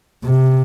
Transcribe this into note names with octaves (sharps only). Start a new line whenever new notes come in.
C3